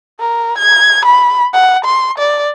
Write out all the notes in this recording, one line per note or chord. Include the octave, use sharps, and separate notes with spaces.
A#4
G#6
B5
F#5
C6
D5